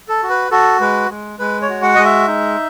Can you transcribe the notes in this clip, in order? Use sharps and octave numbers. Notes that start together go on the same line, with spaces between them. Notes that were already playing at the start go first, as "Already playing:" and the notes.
A4
F#4
B4
F#4 A4
G#3 B4
G#3
G#3 B4
C#5
F#4
F#5
G#3 D#5
E5
D#4